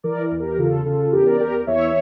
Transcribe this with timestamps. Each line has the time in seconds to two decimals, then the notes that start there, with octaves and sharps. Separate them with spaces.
0.04 E3 A#4 D5
0.31 E2
0.40 G4 A#4
0.58 C#3 F4 A4
0.85 C#3 F4 A4
1.12 E2 G4 A#4
1.27 A#4 D5
1.40 E2 G4 A#4
1.67 E2 C#5 E5